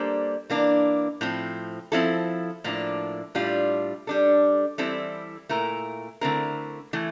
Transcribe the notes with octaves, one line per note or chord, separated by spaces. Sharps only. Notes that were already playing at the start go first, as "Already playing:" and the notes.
Already playing: G3 A#3 D4 A4 C5
E3 A#3 D4
A2 F3 C4
F3 C4 E4 A4
A2 F3 A#3 D4
A2 G3 D4 F4
G3 D4 A4
E3 G3 C4 E4 A4
A#2 A3 E4 A#4
D3 A3 C4 E4 A#4
E3 A3 E4